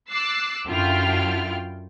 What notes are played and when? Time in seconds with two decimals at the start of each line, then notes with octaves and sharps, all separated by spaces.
0.10 D6 E6 F#6 A6 C7
0.67 F#2 D3 E4 F4 G5 F6